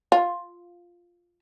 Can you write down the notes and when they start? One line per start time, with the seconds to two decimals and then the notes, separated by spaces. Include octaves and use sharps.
0.12 F4